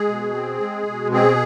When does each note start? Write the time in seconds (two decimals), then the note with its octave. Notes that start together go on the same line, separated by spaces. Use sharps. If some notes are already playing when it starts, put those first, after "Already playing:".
Already playing: G#3 G#4
0.08 B2
0.34 C4
0.60 G#3
0.86 B2
1.12 C4 G#4